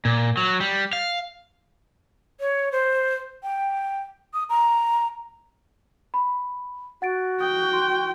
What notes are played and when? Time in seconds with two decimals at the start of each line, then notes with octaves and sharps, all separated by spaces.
0.05 A#2
0.37 F#3
0.60 G3
0.93 F5
2.40 C#5
2.72 C5
3.43 G5
4.34 D#6
4.50 A#5
6.14 B5
7.02 F#4 F#5 A6 D7
7.40 G5 D#6
7.73 C6